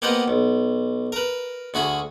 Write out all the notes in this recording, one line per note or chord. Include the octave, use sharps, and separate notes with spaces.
A#3 B3 G4 C5 D#5 F#5
B1
A#4 B4
D2 F#4 G#4 B5